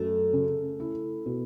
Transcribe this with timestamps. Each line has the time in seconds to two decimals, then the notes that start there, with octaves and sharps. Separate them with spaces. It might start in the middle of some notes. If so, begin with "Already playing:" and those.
Already playing: F#2 A3
0.33 C#3
0.80 E4
1.26 B2